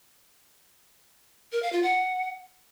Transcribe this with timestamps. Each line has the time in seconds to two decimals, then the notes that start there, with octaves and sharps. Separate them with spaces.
1.52 A#4
1.62 F5
1.73 F4
1.83 F#5